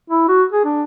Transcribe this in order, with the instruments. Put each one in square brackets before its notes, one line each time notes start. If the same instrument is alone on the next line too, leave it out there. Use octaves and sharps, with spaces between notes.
[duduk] E4
F#4
G#4
D4